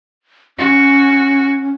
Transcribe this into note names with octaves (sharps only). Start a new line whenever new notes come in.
C#4 F#4